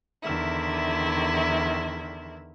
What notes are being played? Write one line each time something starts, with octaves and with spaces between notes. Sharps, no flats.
E2 D3 D#3 E4 E5